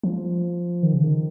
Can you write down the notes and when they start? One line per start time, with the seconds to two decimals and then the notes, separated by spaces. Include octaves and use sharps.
0.04 F3
0.83 D#3
0.93 C#3
1.04 D#3